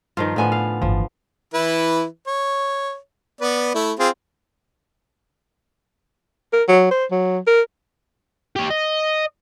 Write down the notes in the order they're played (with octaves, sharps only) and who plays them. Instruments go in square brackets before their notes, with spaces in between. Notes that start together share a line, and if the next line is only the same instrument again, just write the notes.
[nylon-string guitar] G2 [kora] D#3 F3 F4
[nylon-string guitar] A2 G#5 [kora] D3 F3 B3
[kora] F5
[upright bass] G1 E3 [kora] F3
[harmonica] E3 E4 B4
C#5
B3 B4 D5
A3 E4
C4 F4 G#4
[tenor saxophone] A#4
F#3
C5
F#3
A#4
[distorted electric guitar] G4 C#5
D#5